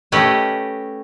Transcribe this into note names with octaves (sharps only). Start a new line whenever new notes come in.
A3 C#4 G4 B4 D#5